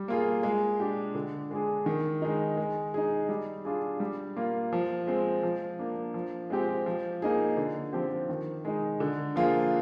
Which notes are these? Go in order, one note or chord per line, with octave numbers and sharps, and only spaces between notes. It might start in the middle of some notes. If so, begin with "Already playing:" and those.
Already playing: G3
A#3 F4 G#4
G#3
D4 G4
D3
G#3 D4 G#4
D#3
G#3 D#4
G#3
D#4 G#4
G3
D4 F4 G#4
G3
A#3 F4
F3
G#3 C4
F3
A#3 D4
F3
G#3 C4 G4
F3
A#3 D#4 G#4
D3
F3 C4 G4
D#3
G#3 D#4
D3
F3 A#3 F4 G#4